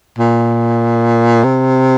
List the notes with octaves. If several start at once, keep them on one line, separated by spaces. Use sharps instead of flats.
A#2
C3